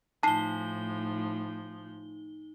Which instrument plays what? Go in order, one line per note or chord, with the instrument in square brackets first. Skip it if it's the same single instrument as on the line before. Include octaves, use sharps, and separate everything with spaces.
[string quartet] A2 F3 [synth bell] D#4 G7 [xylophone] A5 C7